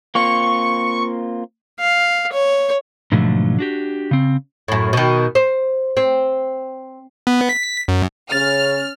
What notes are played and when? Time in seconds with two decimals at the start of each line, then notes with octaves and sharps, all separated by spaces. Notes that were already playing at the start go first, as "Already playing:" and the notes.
0.15 A#3 C4 F4 C#6
1.79 F5
2.32 C#5
3.12 G#2 B2 D3 F3 F#3 A3
3.59 D4 F#4 G4
4.11 C#3 C4
4.68 F#2 A2
4.93 B2 D#3
5.35 C5
5.97 C4
7.27 B3
7.49 B6
7.88 F#2
8.32 C#3 C#4 F6 A6